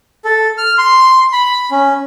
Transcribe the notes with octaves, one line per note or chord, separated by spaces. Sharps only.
A4
F6
C6
B5
C#4